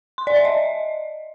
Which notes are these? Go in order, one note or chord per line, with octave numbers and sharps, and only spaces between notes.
C6
D5
E5
D#5